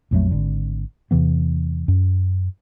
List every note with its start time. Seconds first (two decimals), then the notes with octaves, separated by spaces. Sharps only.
0.11 A#1 F2 F#3 A3
0.31 G#1 D3
1.11 E2 C3 E3 B3
1.88 F#2